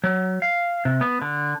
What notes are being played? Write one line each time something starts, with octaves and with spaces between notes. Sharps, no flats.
F#3
F5
C3
B3
D3